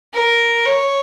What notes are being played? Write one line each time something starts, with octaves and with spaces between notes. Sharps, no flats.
A#4
C#5